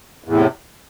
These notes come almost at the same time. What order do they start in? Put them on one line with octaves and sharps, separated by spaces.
E2 A2 C3